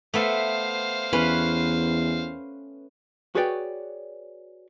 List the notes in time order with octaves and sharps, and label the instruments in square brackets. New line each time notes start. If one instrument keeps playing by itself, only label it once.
[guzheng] A3 B3 E5 [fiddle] C5 F5
[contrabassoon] E2 [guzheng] C#4 B4 B5
[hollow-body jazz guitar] F#4 G#4 B4 C#5 D5 G5